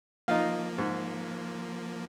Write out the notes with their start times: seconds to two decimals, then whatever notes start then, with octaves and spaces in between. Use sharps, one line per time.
0.28 F3 A#3 D#4 F4 F5
0.78 G#2